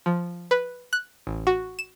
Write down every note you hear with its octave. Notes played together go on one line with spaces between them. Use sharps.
F3
B4
F#6
A1
F#4
E7